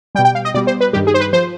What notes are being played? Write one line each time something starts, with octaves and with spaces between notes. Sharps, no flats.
B2 G3 G5
G5
F5
D#5
B2 G3 D5
C5
B4
G2 D#3 G3 G4
G#4
C5
B4
F3 C5